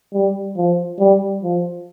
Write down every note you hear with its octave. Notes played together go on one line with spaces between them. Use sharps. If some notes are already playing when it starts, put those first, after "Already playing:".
G3
F3
G3
F3